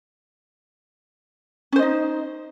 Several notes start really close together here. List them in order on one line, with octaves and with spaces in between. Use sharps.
C#4 C5 D#5 D#4